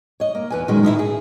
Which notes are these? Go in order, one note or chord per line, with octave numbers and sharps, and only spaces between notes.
C#5 D#5
A#3
E2 B4 G#5
A#2 D#3 F#3 G#3 C#4
A2 D#3 D#4 E4
G#4